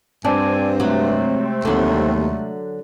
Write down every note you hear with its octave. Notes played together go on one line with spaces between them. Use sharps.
G2 C4 D4 D5 G#5
C3 F#3 G#3 A3
D#2 D3 F#3